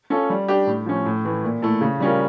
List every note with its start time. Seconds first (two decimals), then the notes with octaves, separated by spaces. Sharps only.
0.10 C#4 F4 A4
0.30 G3
0.49 D4 G4
0.67 A2
0.86 F3 C#4
1.06 A2
1.25 E3 A3
1.44 A#2
1.62 A3 E4 A4
1.81 C#3
2.00 G3 C#4 F4 A#4